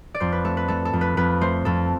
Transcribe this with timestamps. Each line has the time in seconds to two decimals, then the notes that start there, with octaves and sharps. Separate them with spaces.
0.15 D5
0.20 F2 C5
0.32 B4
0.44 A3 A4
0.57 B4
0.68 A3 A4
0.85 A4
0.93 F2
1.01 B4
1.17 F2 B4
1.41 A3 C5
1.65 F2 A4